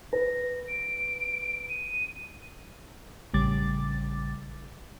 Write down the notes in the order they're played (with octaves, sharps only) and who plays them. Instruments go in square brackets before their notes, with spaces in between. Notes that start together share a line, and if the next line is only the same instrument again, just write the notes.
[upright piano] B4 [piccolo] A#6
[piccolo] D7
D#7
[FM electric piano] A1 C#3 G3 D6 A6